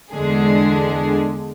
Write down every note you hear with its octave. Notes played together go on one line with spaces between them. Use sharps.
E2 D3 G#3 D4 G#4